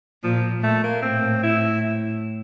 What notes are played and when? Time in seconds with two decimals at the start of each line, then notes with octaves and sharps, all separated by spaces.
0.24 A#2 F3
0.63 A#2 A3
0.83 A#3
1.02 A2 C4
1.43 E4